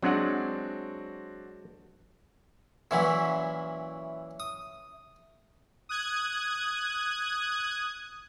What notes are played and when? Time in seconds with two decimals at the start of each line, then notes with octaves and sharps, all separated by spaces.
0.02 F#3 G#3 C4 D4 F#4 F#5
2.91 A#2 E3 F#3 C#4 E4 E5
4.40 D#6
5.89 D#6 F#6 G#6